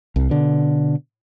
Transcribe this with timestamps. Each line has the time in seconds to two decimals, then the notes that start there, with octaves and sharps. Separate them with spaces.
0.16 C2
0.30 B2 D3